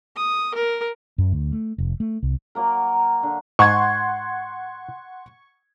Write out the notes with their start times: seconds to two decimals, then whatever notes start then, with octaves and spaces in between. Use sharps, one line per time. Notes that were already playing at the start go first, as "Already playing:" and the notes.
0.16 D#6
0.54 A#4
1.18 F#2
1.32 D2
1.52 A3
1.78 F1
2.00 A3
2.23 C2
2.55 F#3 A#3 A#4
3.23 D3
3.59 G#2 F#5 C6 C#6 G#6